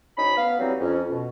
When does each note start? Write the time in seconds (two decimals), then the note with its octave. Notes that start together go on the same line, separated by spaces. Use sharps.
0.17 D2 C#4 D#4 B5
0.36 B3 F5
0.59 E3 F#3 G3 C4 D#4
0.80 F2 C#4
1.09 B2